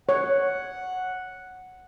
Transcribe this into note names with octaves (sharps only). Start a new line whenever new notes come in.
C#5 F#5